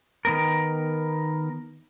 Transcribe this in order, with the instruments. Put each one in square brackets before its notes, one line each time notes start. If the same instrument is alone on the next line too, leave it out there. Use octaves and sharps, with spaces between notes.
[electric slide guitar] D#3 B3 A#4